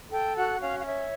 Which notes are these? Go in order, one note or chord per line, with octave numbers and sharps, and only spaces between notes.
A4 G5
F#4 F#5
C#4 F5
F5
C#5 E5